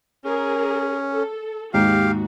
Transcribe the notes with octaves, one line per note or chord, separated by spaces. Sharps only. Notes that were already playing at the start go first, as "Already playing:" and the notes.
C#4 G#4 A#4
A4
D#2 G#2 F#4 G4 F5